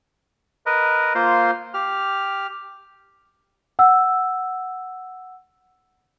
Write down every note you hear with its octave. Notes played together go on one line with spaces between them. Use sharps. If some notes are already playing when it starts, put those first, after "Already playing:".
A#4 B4 D#5
A#3 F4 C5 C6
G4 F6
F#5 E6